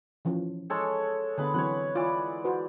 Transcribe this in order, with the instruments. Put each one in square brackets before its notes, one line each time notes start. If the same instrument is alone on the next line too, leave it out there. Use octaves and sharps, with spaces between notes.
[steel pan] E3 F3 C#4
[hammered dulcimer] G#3 A4 C#5
[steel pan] D3 B3 [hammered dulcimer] G#4 B4
[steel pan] E3 F#3 C4 [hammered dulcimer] C#5 F#5
[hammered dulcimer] E3 D5 [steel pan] F4
[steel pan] F#4 B4 C5